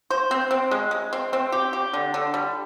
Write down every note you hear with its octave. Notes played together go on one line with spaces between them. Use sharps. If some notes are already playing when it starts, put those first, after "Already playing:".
C5
C4
C4
G#3
G#3
C4
C4
G4
G4
D3
D3
G3